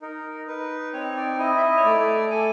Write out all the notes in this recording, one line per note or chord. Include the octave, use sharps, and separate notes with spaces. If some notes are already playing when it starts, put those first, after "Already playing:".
D#4 A#4
D#4 B4
C4 C#5
D5
E4 D#5
E5
D#5
C#5
A3 D5
A4 G#5